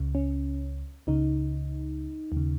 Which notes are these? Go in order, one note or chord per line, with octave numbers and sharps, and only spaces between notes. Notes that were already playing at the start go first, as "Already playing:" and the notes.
Already playing: C#2 C#3
C#4
C#2 C#3 D#4
D#2 C#3